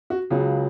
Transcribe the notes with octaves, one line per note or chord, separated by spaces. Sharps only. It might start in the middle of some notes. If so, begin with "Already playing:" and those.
F#4
C#2 C#3 F#3 G#4